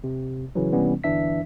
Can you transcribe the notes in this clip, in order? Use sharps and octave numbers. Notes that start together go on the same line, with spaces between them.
C3
C#3 E3 F#3
C3 E3 G3 B3 C#4
G1 E3 D4 E5 B6